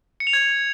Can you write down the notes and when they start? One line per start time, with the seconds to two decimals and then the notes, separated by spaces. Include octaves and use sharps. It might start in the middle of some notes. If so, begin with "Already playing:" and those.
0.20 C#7
0.27 F7
0.33 G#6